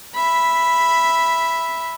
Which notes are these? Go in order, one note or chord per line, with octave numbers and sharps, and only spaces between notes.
E5 B5